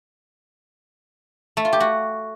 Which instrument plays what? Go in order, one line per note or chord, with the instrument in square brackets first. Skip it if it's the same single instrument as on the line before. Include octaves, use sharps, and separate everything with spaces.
[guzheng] A3
F4
G4
F#4